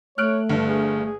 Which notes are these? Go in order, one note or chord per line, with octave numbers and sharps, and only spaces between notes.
A3 C#5 F6 F#6 D7
G1 G2 A4
G#4
G#4